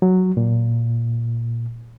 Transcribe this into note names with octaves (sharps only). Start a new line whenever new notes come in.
F#3
A#2